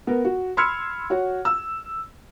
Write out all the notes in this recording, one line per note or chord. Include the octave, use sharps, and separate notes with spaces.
B3 A#4
F#4
B5 C6 E6 F6 G#6 C#7
F#4 C#5 F#5
E6